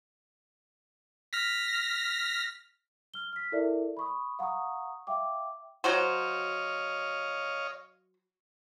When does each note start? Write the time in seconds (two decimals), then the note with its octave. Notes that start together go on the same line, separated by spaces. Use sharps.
1.33 F6 A#6 B6
3.14 F6 G7
3.33 F6 B6
3.52 E4 A4 A#4 D5 E5
3.97 B5 C#6 D#6
4.39 F5 F#5 A#5 C#6 D#6
5.07 E5 F5 G5 D6
5.84 F#3 F#4 C5 C#5 D#5 F5